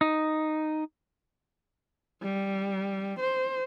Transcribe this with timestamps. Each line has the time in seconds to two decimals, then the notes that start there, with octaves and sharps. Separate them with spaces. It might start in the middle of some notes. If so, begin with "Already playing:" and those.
0.01 D#4
2.23 G3
3.20 C5